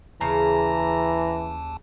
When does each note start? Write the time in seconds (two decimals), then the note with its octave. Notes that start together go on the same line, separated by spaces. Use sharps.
0.21 D#2 C#3 E3 A5 A#5